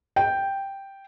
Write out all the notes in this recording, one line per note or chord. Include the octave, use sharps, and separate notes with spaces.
G5